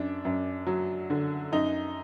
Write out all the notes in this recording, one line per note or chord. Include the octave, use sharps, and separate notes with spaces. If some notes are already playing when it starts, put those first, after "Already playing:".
Already playing: F#2 D4
F#2
F#3
D3
F#2 D#4